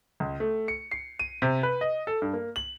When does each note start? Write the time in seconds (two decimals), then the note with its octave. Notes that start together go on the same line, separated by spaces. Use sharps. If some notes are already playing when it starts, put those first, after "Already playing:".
0.20 C#2
0.40 A3
0.68 C#7
0.91 C7
1.19 D#7
1.42 C3
1.63 B4
1.81 D#5
2.07 A4
2.22 G2
2.33 A#3
2.56 F#7